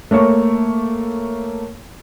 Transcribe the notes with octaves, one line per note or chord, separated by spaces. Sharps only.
A3 A#3 C#5 C#6